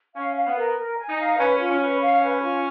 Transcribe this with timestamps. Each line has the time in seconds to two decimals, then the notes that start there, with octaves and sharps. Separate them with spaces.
0.16 C#4 F5
0.37 F5
0.47 B3
0.57 A#4
0.78 A#4
0.98 G#5
1.08 D#4
1.18 F5
1.39 C#4 B4
1.59 F4
1.70 C#4
1.81 B4
2.01 F5
2.22 B4
2.42 F4